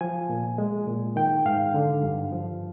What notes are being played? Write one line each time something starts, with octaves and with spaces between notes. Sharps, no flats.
F3 G#5
A#2
G#3
A#2
D#3 G5
G#2 F5
D3
G2
F3